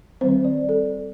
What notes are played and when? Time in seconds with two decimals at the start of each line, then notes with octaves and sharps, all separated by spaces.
0.21 D#3 G3 C4 C5
0.44 D5
0.69 A4